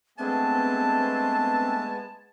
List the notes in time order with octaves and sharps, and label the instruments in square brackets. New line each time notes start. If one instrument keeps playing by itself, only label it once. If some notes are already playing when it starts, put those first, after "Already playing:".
[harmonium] G#3 B3 G#5 [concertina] A3 D4 [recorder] C4 [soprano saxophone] A5